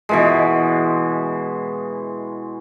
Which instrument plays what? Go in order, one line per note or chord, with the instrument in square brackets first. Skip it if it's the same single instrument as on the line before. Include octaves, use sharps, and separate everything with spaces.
[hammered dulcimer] B2 E3 G#3